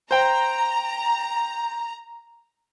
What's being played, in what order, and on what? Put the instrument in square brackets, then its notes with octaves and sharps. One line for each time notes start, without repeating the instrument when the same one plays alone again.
[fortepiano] C5 G5 [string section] A#5